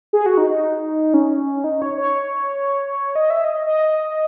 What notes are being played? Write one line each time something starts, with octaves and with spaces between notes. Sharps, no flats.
G#4
F#4
D#4
D#4
C#4
D#4
C#5
C#5
D#5
E5
D#5
D#5